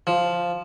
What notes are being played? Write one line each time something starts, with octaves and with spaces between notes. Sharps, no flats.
F3